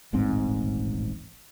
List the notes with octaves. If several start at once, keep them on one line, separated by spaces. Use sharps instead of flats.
D#1 A1 G#2 C4